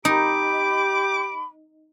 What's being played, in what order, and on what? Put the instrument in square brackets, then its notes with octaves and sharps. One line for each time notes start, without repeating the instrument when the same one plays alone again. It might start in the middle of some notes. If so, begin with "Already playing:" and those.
[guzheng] D#4 [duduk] G4 [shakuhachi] B5 [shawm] D6